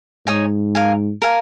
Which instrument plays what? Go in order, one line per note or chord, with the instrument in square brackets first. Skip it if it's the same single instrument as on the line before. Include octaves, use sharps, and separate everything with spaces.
[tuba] G#2 [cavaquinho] D#4 C#5 G#5 D#6
[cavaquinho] A#4 F5 G#5
A#4 F5 G#5